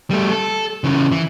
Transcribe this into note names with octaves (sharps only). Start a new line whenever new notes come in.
G3 A3
A4
C#3 E3
E3